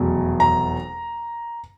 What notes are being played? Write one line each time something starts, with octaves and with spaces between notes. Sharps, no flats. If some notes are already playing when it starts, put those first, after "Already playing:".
Already playing: F1 E2 B2 F#3
A#5